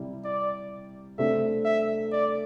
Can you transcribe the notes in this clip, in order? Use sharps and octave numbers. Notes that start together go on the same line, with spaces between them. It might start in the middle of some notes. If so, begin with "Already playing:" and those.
Already playing: C3 G3 E4
D5
C3 A3 D4 A4 C5 E5
E5
D5